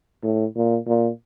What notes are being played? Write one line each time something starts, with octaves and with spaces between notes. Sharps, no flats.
A2
A#2
A#2